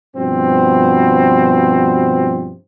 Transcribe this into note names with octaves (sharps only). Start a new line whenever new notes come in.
G2 B2 F3 C4